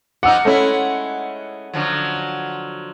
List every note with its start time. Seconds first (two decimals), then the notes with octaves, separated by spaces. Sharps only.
0.23 F3 D#4 F#5 D6 E6
0.45 G#3 A3 C#4 E4
1.73 D3 F3 F#3